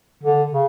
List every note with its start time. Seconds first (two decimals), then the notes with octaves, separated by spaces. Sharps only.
0.23 D3
0.51 C#3